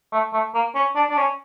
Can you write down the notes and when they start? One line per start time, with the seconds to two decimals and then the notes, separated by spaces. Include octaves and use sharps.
0.12 A3
0.33 A3
0.55 A#3
0.75 C#4
0.96 D4
1.10 D4
1.17 C#4